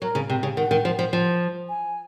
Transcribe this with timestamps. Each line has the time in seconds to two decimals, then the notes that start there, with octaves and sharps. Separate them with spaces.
0.01 F#3 A#4
0.15 C#3
0.30 C3
0.43 C#3
0.57 D#3 F#5
0.71 D#3
0.85 F3
0.99 F3
1.13 F3
1.69 G#5